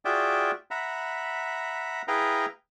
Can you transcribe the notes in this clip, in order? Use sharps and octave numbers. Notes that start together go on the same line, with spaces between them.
F4 F#4 G#4 D5 E5 G5
E5 F#5 A#5 B5
E4 G#4 B4 F5 G5 A#5